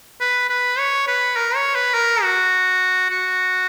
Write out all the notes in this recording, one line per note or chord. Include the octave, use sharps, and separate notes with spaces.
B4
B4
C#5
B4
A#4
C#5
B4
A#4
F#4
F#4